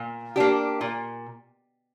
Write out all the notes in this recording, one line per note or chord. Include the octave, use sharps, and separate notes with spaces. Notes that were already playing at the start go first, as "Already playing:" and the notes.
Already playing: A#2
A#3 D4 G4
A#2